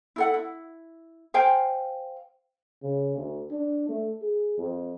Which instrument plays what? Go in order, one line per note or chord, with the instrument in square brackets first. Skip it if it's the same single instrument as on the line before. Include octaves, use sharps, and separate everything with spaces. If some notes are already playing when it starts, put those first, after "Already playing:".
[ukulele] E4 A4 F#5
E4
C5 F5 G5 G#5
[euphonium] C#3
D2
D4
A3
G#4
F2